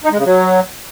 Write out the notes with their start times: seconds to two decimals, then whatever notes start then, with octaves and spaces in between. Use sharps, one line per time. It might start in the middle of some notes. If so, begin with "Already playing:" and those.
0.04 D#4
0.11 G#3
0.18 C#3
0.25 F#3